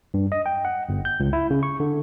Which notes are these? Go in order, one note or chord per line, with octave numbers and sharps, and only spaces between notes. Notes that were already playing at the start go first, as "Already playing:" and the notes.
G2
D#5
G5
F#5
G1
G6
C#2
E4
C#3
C#6
D3